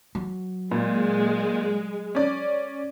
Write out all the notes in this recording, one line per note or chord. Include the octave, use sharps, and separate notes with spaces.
F#3
A#2 G#3
C#4 D5